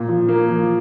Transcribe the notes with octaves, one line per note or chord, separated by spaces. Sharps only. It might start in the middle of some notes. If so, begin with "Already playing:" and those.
Already playing: A#2
F3
A#3
F3